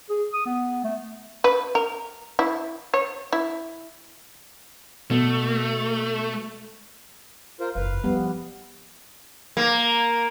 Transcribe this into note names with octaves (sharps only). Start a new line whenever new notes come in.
G#4
D#6
B3
A3
B4
A#4
E4
C#5
E4
B2 A3
F4 A#4 C5
F#1 E2 B4 F5
F3 G3 B3
G#2
A#3